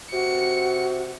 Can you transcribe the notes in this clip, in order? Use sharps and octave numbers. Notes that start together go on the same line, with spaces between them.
C3 F#4 C#7